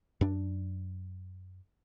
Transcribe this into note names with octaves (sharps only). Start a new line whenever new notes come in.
F#2 D4